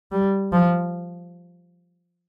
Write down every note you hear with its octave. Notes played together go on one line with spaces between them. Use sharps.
G3
F3